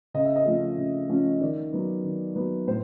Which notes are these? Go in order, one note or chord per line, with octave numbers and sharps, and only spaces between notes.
C#3 D#5
E5
D#5
F3 A3 C#4
C#3
F3 A3 C#4
D#3 D5
F#3 B3
D#3
F#3 B3
A2 C5